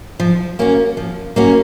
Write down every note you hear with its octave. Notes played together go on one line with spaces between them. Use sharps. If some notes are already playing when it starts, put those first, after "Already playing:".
F3
A#3 C#4 F#4
F3
A#3 C#4 F#4